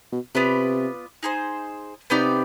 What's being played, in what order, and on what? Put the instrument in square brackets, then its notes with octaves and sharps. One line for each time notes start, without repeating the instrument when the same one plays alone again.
[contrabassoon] B2
[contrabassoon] C3 [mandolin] B3 F4 B4 D5
[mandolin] D#4 G#4 C5
[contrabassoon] C3 [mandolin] B3 D#4 G4 D5